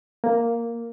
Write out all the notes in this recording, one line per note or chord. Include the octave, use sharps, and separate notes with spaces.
A#3